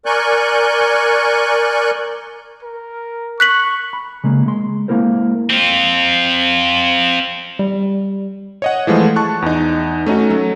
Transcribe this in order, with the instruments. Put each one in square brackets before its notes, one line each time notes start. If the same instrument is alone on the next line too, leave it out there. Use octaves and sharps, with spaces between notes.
[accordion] A#4 D5 G#5 C#6 F#6 G6
[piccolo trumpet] A#4
[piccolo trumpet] C#6 [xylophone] F#6 B6 F#7
[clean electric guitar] B5
C#3 G#3 A#3
G#3 C6
G#3 A#3 C4 E4 A#4 C5
[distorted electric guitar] C4 F4
[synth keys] G3
[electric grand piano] C#5 D#5 F#5
E3 F3 G#3 A3
A5 C#6 F#6
E2 D#4
A3 C#4 D#4 F#4
F#3 A3